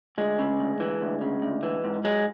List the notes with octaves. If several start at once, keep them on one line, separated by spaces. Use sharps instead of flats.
D2 G#3
C#3
D2
E3
D2
C#3
D2
E3
G#2
F#3 G#3